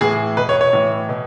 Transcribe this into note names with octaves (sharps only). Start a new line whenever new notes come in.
A2 E3 G#4
B2 B4
C#5
C#5
A2 E3
B2